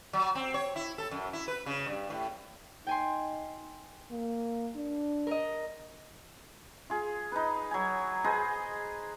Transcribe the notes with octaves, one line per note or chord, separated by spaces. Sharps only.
F#3
C4
C#5
E4
A4
F#2
E4
B4
C#3
G2
A2
D#4 G5 G#5 C6
A#3
D4
A#4 D#5
F4 G#4
D#4 B4
F#3 G#5
G#4 B4 C5 D#5